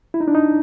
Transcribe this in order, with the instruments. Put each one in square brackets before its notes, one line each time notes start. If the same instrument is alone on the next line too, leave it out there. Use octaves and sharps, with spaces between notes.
[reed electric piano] E4
D#4
D4
D#4